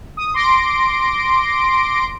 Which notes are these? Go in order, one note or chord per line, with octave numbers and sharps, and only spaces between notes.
D#6
C6 D6 A#6 D7